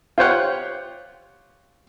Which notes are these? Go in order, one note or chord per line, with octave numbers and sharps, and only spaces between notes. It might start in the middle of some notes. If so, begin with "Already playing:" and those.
F4 G4 C5 C#5 F#5 G5